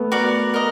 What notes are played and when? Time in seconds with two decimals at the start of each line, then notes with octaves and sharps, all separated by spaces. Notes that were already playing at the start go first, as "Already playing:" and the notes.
Already playing: A3 B3
0.12 F#4 A#4 D5
0.54 A#4 D#5